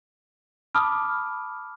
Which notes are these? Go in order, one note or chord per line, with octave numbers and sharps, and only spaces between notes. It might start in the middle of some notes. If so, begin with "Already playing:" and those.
A5 B5 D6 D#6 F6